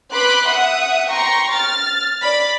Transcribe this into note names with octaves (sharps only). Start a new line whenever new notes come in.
B4 B5 C6 D6 F#6
E5 F#5 D#6
G5 A#5 C6 C#6
F6 A6
D5 B5